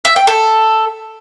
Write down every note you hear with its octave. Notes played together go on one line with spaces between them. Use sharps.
E5
G5
A4